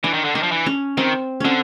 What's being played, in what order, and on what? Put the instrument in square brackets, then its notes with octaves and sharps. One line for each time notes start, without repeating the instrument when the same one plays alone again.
[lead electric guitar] E3 [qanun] D4
[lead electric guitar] D#3
D3
[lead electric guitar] D#3 [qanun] D4
[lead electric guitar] F3
E3
[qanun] C#4
[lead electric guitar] D#3 [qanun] C4
[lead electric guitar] D3 [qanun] C4 C#4